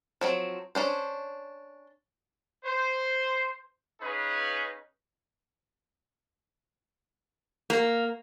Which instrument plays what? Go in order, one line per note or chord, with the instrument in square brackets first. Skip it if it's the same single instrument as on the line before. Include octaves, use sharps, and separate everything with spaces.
[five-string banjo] F3 F#3 C4
C#4 D4 C5
[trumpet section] C5
C#4 D#4 G#4 B4 F5
[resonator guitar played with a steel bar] A#3